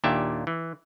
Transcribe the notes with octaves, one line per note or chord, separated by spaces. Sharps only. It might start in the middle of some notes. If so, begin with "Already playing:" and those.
D#2 A#2 D4 G4 E5
E3